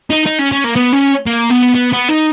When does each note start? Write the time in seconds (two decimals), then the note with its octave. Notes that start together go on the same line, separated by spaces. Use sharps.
0.10 D#4
0.26 D#4
0.39 C#4
0.52 C#4
0.64 A#3
0.76 B3
0.93 C#4
1.27 A#3
1.51 B3
1.75 B3
1.93 B3
2.09 D#4